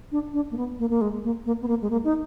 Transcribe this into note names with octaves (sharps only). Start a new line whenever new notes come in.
D4
D4
A#3
B3
A#3
A#3
G#3
A#3
A#3
B3
A#3
G#3
A#3
D#4